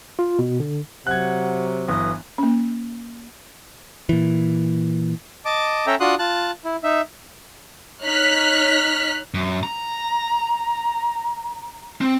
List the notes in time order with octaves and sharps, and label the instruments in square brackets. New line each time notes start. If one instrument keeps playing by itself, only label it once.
[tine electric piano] F4
B2
D3
[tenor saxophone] C3 [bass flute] F#3 [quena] F#5 [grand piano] F#6 G#6
[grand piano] G1 E3 [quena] D#6
[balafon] A#3 C#4
[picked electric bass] A#2 E3
[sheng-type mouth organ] D#5 A5 D6
C#4 A4 E5 G5 A#5
D4 F4 F#4 C6 D#6 F#6
F4 A5 F#6
E4
D#4 E5
[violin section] D#4 C#5 F6 F#6 B6
[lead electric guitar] F#2
A#5
C4